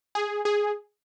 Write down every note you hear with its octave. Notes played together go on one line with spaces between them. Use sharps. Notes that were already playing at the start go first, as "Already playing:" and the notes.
G#4
G#4